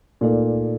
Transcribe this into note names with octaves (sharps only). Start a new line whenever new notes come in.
A#2 A3 D#4 A4 D5